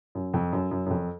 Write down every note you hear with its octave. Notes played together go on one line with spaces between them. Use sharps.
F#2
F2
F#2
F#2
F#2
F2